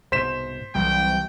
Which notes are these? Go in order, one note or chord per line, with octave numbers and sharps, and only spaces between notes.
C2 G#2 B2 C5 B6 E7
C2 E3 F#3 G3 G5